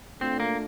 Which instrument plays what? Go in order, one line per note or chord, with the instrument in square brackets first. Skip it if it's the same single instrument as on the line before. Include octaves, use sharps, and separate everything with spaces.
[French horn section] A3 D4 F4 [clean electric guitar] C4
[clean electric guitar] A#3